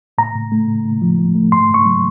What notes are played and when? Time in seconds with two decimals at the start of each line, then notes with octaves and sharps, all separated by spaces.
0.18 A2 A#5
0.35 A2
0.52 A3
0.68 A2
0.85 A2
1.02 F3
1.19 F3
1.35 A3
1.52 G#2 C6
1.68 G#2
1.74 C#6
1.86 F#3